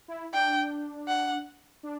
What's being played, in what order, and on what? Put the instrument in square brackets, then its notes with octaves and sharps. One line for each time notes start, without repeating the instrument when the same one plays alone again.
[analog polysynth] E4
[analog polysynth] D4 [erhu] G5
[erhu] F#5
[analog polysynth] D4